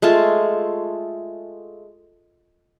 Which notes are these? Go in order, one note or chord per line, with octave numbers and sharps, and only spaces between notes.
G#3 A3 F4 A5